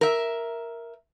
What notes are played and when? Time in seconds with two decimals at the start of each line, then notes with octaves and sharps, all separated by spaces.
0.01 A#4 E5